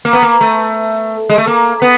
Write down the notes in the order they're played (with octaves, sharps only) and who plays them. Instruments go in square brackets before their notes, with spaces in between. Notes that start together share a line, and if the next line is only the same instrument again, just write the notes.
[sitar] A#3
B3
A#3
A3
G#3
A3
A#3
B3